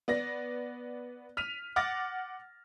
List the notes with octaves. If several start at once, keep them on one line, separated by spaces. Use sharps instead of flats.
B3 D5 A#6
F6 B6 D#7 F7
F#5 D6 F6 A6 A#6